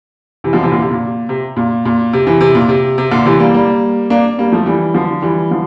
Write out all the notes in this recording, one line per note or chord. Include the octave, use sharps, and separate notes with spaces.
C3 E3
D3 F3
C3 E3
A#2 D3
C3
A#2
C3
A#2
A#2
C3
C3 E3
C3
A#2
C3
C3
A#2 D3
C3 E3
G3 A#3
G3 A#3
A#3 D4
G3 A#3
F3 A3
E3 G3
D3 F3
E3 G3
D3 F3